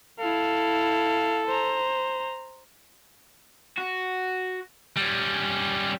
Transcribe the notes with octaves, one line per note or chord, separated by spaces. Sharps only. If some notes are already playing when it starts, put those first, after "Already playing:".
E4 A4 F5
C5 A#5
F#4
G3 C#4